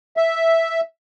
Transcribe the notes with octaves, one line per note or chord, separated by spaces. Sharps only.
E5